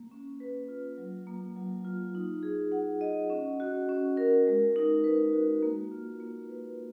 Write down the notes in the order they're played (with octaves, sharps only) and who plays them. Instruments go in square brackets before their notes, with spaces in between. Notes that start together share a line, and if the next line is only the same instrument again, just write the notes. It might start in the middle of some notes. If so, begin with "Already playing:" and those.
Already playing: [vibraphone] A#3
C#4
B4
F4
F#3
A#3
F#3
F4
D#4
G#4
F#5
D#5
C#4
F#4
C#4
A#4
G#3
D#4
B4
F#4
A#3
F4
A#3
B4